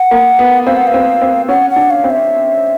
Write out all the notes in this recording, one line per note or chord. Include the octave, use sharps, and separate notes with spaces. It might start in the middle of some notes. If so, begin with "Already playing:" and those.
Already playing: F#5
A#3
B3
C4 F5
F#5
F5
C4
C4
C#4 F#5
F#5
D4
F5
C4
E5